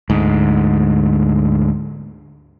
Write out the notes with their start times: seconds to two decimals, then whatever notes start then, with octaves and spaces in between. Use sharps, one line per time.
0.10 D2 G#2